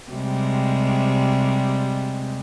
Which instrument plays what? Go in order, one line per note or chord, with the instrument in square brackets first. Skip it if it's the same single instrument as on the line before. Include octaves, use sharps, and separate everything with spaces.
[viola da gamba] C3 G3 G#3